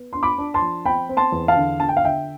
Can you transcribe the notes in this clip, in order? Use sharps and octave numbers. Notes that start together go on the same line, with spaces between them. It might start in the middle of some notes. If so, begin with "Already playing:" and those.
Already playing: B3
D4 C6
B5 D6
D4
A5 C6
F3
C4 G5 B5
C4
A5 C6
E2
F5 A5
D3
D3 A5
G5
F5
D3 E5 G5